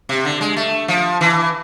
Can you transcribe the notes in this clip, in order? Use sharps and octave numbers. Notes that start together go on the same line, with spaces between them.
C3
D3
G#3
A3
F3
E3